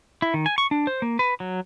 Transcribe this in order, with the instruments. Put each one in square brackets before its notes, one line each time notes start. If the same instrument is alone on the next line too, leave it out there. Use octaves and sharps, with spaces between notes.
[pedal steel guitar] E4
D#3
G#5
C#6
D4
C5
A#3
B4
F#3